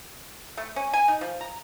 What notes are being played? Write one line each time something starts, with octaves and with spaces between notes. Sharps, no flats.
A3
C#4
G#5
D#4
F3
A#5